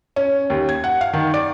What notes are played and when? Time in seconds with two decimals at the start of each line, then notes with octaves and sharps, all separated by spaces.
0.16 C#4
0.50 D#2
0.69 G#6
0.84 F#5
1.01 F5
1.14 D#3
1.34 D5